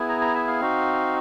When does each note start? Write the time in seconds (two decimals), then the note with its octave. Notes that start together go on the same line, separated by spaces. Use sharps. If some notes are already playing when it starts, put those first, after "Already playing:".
Already playing: B3 E4 G#4
0.09 A#5
0.21 A#5
0.35 E5
0.48 F5
0.60 C4 D#4 F#4